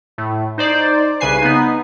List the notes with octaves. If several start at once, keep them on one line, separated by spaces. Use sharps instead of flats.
A2
D#4 C5 D5
C2 C#3 B4 G#5 C7
B3 D#4